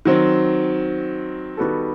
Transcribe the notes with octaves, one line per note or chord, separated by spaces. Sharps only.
D#3 F#3 C4
D#3 G3 B3 F#4 A4